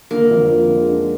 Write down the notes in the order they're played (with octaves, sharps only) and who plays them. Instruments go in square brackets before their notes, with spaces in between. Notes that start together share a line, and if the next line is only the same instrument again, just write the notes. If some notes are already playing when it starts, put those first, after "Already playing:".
[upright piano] D3 [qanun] A#3
[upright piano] F2
F3
G#3
D4